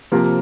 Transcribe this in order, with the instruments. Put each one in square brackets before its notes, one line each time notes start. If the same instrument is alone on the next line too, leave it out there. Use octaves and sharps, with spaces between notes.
[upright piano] C3 F3 A#3 F4 A#4